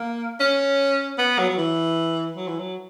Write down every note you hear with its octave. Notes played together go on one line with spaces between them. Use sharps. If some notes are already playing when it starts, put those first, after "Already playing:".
Already playing: A#3
C#4
B3
F#3
F#3
E3
F#3
E3
F#3